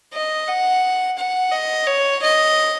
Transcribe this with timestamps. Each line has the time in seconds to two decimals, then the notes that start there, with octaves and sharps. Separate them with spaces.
0.14 D#5
0.48 F#5
1.19 F#5
1.52 D#5
1.87 C#5
2.23 D#5